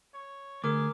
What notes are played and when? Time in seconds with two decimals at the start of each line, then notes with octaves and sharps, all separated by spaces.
0.14 C#5
0.64 D2 G#4 A#4 D6